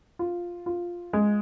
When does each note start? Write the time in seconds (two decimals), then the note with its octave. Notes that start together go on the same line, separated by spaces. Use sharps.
0.19 F4
0.66 F4
1.13 G#3